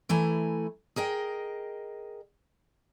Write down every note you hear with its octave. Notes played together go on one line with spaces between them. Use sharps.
E3 A3 E4 G#5 A#5
G#4 A#4 D#5 G5